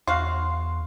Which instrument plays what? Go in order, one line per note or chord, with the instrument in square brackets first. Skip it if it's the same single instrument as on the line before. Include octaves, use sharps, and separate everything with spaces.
[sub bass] E2 [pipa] F#4 F5 [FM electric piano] C6